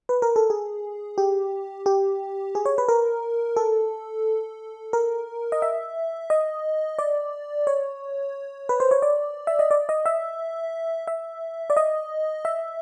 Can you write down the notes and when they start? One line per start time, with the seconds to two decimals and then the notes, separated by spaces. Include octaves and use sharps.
0.09 B4
0.22 A#4
0.36 A4
0.50 G#4
1.18 G4
1.86 G4
2.55 G#4
2.65 C#5
2.78 B4
2.88 A#4
3.56 A4
4.93 A#4
5.52 D#5
5.62 E5
6.30 D#5
6.99 D5
7.67 C#5
8.69 B4
8.80 C5
8.91 C#5
9.02 D5
9.47 E5
9.59 D#5
9.71 D5
9.89 D#5
10.06 E5
11.07 E5
11.70 D5
11.77 D#5
12.45 E5